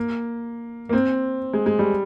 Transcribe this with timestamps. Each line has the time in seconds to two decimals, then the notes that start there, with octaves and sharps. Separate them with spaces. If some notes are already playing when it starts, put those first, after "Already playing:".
Already playing: A#3
0.89 A#3
0.93 C4
1.53 G#3
1.66 G#3
1.79 G3